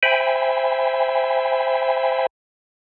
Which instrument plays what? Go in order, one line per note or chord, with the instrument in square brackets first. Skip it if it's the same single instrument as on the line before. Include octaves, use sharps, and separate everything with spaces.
[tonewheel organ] C5 E5 G5 G#5 B5